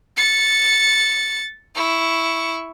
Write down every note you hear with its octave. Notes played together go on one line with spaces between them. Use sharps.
A6 C#7
E4 C#6